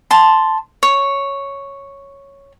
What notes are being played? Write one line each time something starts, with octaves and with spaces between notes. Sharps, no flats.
A5 C6
C#5